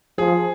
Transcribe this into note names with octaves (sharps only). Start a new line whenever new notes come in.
F3 G#4